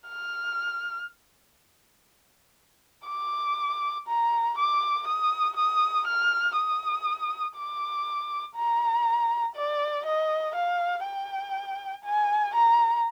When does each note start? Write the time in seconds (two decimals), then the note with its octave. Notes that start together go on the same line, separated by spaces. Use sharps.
0.08 F6
3.07 D6
4.07 A#5
4.57 D6
5.07 D#6
5.56 D#6
6.07 F6
6.56 D#6
7.56 D6
8.56 A#5
9.55 D5
10.05 D#5
10.55 F5
11.05 G5
12.04 G#5
12.55 A#5